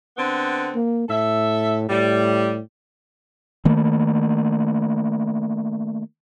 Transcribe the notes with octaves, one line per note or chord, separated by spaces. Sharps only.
D3 B3 C4
A#3
A2 A4 E5
A2 G3
D#3 A3 A#3